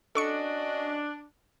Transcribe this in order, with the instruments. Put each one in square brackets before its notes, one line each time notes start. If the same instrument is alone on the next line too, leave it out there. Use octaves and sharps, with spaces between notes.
[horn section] C#4 F#4 D#5 [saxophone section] D4 [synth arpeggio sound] A4 C#6 C#7